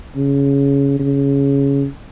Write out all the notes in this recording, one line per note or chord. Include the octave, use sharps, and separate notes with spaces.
C#3
C#3